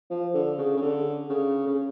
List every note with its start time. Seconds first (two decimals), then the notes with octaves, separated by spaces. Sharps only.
0.10 F3
0.34 D3
0.58 C#3
0.77 C#3
0.82 D3
1.29 C#3
1.67 C#3